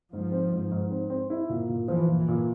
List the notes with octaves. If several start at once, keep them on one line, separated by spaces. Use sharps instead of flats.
G#2 F3
C4
G#2
G#2
C4
C4
E4
A#2
A#2
E3 F3
A#2
E3
A#2